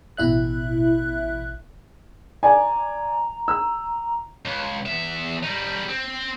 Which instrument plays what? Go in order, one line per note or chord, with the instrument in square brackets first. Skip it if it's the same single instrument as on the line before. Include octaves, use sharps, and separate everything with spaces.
[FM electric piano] A1 B2 E4 E5 F#6
[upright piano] D5 G#5 [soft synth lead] A#5
[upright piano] E6
[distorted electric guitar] C#2
E2 E5
G3 D#4
C4